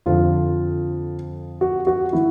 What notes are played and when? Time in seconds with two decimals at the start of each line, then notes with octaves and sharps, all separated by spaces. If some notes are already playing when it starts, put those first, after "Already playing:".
0.06 F2 D3 F3 F4
1.61 F#4
1.87 F#4
2.13 D#3 E4